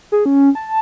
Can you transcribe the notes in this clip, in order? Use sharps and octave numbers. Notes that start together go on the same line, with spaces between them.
G#4
C#4
A5